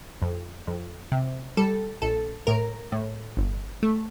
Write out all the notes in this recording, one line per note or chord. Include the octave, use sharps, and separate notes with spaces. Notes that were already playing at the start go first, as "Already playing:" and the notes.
F2
F2
C3
G3 A4
A#1 A4
A2 A#4
A2
G1
A3